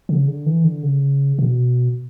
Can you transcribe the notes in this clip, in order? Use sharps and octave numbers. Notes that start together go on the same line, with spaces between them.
C#3
D3
E3
D3
C#3
B2